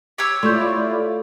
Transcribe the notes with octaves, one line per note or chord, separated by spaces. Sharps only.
G4 C#5 E6
A3 E4 F4 D5 C6 C#6 G6